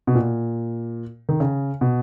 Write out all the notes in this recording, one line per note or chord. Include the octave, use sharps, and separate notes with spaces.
B2
A#2
D#3
C#3
B2